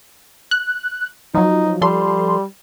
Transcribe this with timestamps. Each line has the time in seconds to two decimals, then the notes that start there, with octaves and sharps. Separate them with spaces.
0.51 F#6
1.35 F3 F#3 D#4
1.81 F3 G3 A4 C6